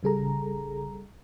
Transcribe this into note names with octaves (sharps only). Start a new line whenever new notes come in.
A1 C#3 G3 G#4 A4 A#5